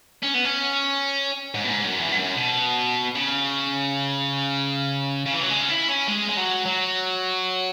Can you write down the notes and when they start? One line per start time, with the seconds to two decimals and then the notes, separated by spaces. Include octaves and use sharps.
0.23 C#4
0.34 B3
0.45 C#4
1.54 G#2
1.64 B2
1.69 G#2
1.84 F#2
1.99 E2
2.12 G#2
2.18 F#2
2.37 B2
3.16 C#3
5.26 C#3
5.33 E3
5.42 F#3
5.50 G#3
5.60 C#4
5.69 E4
5.88 C#4
6.07 G#3
6.29 G#3
6.37 F#3
6.66 F#3